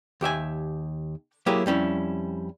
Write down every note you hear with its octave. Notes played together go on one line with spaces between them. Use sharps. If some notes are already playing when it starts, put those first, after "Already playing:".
D#2 G4 E5 G#5
F#3 A#3 E4 G4 G#4
F2 G3 C#4 E4